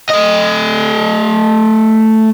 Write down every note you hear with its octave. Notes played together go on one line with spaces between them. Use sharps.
A3 D#5